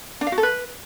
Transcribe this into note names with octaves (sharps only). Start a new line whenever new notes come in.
D4
F5
F#4
A4
B4